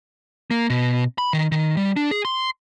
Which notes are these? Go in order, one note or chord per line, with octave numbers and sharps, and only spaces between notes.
A#3
B2
B5
D#3
D#3
G3
D4
G#4
C6